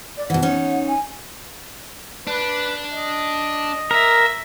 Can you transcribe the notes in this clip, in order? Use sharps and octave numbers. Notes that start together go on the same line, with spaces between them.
D5
B2 E3 F#5
C#4 D#4 C#5
G#5
D4 B4
D#5
A#4 E5